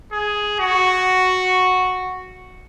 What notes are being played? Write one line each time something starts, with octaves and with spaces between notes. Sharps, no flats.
G#4
F#4